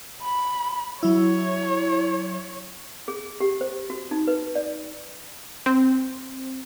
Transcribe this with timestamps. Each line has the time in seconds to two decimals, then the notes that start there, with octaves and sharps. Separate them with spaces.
0.23 B5
1.03 F#3 E4 C#5
3.08 G#4
3.40 G4
3.61 C5
3.90 F#4
4.11 D#4
4.27 B4
4.55 D5
5.66 C4